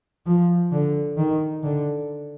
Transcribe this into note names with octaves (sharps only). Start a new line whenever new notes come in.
F3
D3
D#3
D3